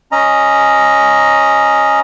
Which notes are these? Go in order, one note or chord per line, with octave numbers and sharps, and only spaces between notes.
C#4 D#5 A#5